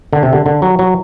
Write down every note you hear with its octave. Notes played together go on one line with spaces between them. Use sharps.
D3
C3
D3
D3
F#3
F#3